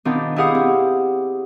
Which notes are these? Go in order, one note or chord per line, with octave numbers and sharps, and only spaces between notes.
B2 D#3 C4 D4 F4
E4 G4 G#4 F5 F#5 D#6
C4